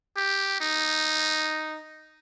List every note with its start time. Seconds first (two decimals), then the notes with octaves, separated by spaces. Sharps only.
0.17 G4
0.60 D#4